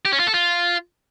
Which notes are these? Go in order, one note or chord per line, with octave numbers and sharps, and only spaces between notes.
G4
C#4
F4
A4
F4